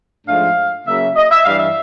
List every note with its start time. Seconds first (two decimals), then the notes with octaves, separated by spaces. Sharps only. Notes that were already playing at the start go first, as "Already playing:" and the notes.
0.27 G#2 F3 A3 D4 F5
0.87 C#3 F#3 A#3 C#4 E5
1.16 D#5
1.31 E5
1.45 G2 E3 G3 F5
1.58 E5